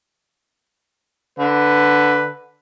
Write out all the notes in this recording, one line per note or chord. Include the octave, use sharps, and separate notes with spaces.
D3 B4